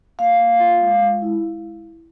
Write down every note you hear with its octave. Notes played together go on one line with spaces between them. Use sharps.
A#3 F5
A#3
F4
G#3
G#3
E4